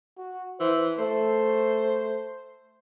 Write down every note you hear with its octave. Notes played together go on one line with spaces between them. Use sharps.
F#4
E3 C5
A3 C5